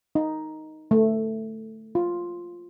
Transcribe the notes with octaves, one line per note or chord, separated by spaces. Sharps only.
D#4
A3
F4